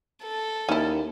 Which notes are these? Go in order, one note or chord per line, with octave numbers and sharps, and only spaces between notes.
A4
D#2 C#4 E4